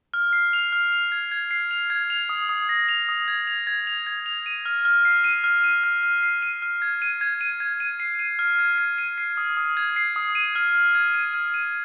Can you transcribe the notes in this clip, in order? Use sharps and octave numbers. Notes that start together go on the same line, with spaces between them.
F6
C7
F7
F6
F7
G#6
G#6
C7
F7
G#6
F7
D#6
D#6
A#6
F7
D#6
G#6
F7
G#6
F7
G#6
F7
D#7
F6
F6
C7
D#7
F6
D#7
F6
F6
C7
D#7
F6
G#6
D#7
G#6
D#7
G#6
D#7
C7
D#7
F6
G#6
C7
D#7
C7
D#6
D#6
G#6
C7
D#6
D#7
F6
F6
G#6
D#7
F6
D#7